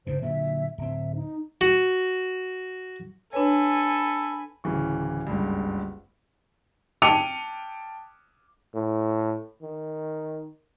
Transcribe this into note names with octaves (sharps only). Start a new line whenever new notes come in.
F#1 G#2 B2 C5
A#2 D3 F#3 E5
D1 C4 E5
D#4
F#4
D4 A4 B4 C#5 G#5 B5
D1 C#3 E3 C#6
F#1 C#2 G2
G5 A5 D6 C#7 D#7 F7
A2
D#3